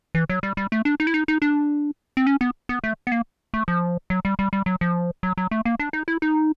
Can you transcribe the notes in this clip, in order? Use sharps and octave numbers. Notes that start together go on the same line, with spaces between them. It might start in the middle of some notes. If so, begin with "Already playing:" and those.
E3
F#3
G3
G3
A3
D4
D#4
E4
D#4
D#4
D4
C4
C#4
B3
B3
A3
B3
A#3
A3
F3
F#3
G3
G3
G3
F#3
F3
F#3
F#3
A3
A#3
D4
D#4
E4
D#4